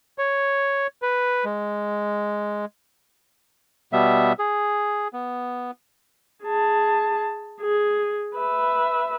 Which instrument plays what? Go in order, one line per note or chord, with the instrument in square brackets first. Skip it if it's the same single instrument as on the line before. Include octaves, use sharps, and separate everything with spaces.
[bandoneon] C#5
B4
G#3
B2 G3 B3 E5
G#4
B3
[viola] G#4 A5
G#4
B4 E5